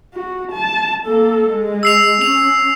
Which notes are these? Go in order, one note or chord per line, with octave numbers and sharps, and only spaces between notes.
F#4
A5
A#3 A4
G#3
E6 C7 F7
C#4 F7